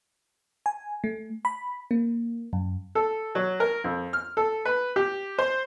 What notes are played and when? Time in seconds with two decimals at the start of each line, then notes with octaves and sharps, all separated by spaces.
0.66 G#5
1.04 A3
1.45 B5
1.91 A#3
2.53 F#2
2.95 A4
3.35 F#3
3.60 A#4
3.84 F2
4.13 F6
4.37 A4
4.65 B4
4.96 G4
5.38 C5